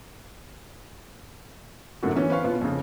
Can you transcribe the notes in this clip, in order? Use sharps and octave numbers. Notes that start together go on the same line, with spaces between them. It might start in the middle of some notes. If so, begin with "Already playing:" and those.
F#2 A2 D3 A#3 F#4
E3 B3 C#4
B4 C5 F5 C#6
B2 B3 F4
F2 C#3